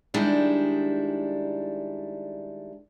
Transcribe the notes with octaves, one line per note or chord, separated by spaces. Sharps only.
D#3 G3 G#3 D4 E4